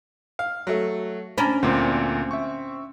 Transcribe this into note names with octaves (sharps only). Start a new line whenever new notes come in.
F5
F#3 A3
C#4 D4 A#5 B5
D2 A#2 C4
E5 C#6